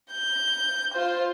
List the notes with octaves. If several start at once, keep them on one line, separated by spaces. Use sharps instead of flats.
G6
F4 C5